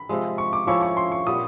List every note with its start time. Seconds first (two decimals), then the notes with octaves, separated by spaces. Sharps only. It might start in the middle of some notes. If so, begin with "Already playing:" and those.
Already playing: B5
0.09 C3 F3 G#3
0.38 C#6
0.53 D6
0.67 F3 A3 C#4 E4 C#6
0.82 C#6
0.97 C6
1.12 C#6
1.26 A#2 G3 B3 D#6